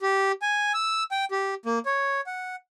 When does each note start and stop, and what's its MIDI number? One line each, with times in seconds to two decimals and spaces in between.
0.01 0.32 67
0.42 0.72 80
0.74 1.04 88
1.11 1.25 79
1.31 1.54 67
1.66 1.79 58
1.86 2.21 73
2.26 2.56 78